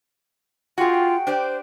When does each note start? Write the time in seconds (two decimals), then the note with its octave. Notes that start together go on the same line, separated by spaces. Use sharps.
0.78 F4 F#4 G#4 G5
1.27 D4 G4 C5 D5